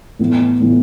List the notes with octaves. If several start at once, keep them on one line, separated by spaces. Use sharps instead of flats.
A2 E3 B3
A2 E3 B3